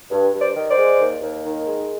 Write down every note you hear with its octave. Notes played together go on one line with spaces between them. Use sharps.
G2
G2
C5 D5
D#3
C5 D5
G#3
D#2
D#2
D#3
G#3